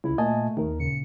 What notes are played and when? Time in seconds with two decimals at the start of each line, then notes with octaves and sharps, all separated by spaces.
0.04 C#2 E4
0.18 A#2 A3 D#5 G#5 A5
0.57 D#2 D#3 A#4
0.80 A#2 C#3 C#7